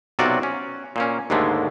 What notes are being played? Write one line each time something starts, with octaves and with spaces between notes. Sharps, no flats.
B1 C3 F#3 F4 F#4 D5
C#4
A#2 A#3 C#4
D#2 G#2 D3 G#3 A3